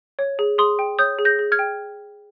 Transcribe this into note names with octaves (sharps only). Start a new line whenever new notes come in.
C#5
G#4
G#4 C6 D#6
G5
C#5 D#6 G6
G#4
G6 A#6
G#4
F6 G#6
G5